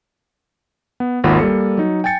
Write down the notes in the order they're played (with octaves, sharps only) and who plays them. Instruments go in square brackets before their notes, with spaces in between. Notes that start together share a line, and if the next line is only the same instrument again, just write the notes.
[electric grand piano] B3
G#1 D#2 A#3 F4 F#5 B5
G3 A#3 A4 C#7
F#3 D#4
G5 G#5 A6 C#7